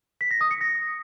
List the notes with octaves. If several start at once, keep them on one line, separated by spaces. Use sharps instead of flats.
B6
A#6
D#6
C#7
A#6